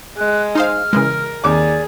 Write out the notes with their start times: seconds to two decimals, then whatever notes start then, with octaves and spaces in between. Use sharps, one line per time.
0.18 G#3 F#6
0.55 D#4 C5 F5 F6
0.93 C#3 E3 G#3 A#4
1.44 D#2 G#4 D5 D6